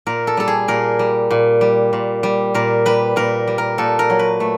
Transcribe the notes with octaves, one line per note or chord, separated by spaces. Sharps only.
A#2 A#4
A4
G3 A4
G#4
A#2 A#4
G3
A#2
G3
A#2
G3
A#2 A#4
G3 B4
A#2 A#4
G3
A#4
A#2 A4
A#4
F#3
B4
A3